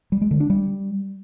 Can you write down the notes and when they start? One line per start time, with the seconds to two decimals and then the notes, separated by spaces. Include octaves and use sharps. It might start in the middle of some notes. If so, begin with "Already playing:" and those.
0.12 G3
0.21 G#3
0.31 D3
0.40 D4
0.50 G3